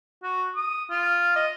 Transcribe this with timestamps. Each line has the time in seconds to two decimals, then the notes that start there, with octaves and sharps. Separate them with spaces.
0.23 F#4
0.56 D#6
0.90 F4
1.36 D#5